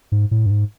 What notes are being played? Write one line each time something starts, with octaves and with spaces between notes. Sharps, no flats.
G#2
A2
G2
G#2